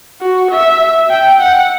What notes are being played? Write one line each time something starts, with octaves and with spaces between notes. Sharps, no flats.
F#4
E5
G5
F#5